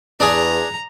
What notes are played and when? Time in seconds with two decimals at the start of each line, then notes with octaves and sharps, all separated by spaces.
0.20 E2 D4 G#4 A#5